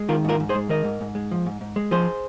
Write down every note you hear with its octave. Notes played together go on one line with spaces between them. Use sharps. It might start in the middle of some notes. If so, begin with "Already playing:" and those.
Already playing: G#3
D#3 F4 A#4
G#2 F4 A#4
G#2
G#4 C5
G#3
D#3 A#4 D#5
G#2
G#2
G#3
F3
G#2
G#2
G#3
F3 G#4 C5